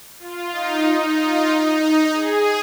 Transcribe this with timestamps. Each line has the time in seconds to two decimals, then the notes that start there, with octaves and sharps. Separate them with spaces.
0.19 F4
0.52 D#4
1.16 F4
1.48 D#4
1.81 D#4
2.13 G#4